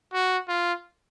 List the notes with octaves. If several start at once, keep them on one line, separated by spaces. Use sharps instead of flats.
F#4
F4